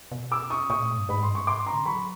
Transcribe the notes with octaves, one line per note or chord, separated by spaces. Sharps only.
B2
D6 E6
C#6 D#6
A#2 C#6 D#6
A2
G2
G#2 B5
C6
G2
C#6
G#2 C6 D6
A2
A#5 C6
D3
F#3 B5 C#6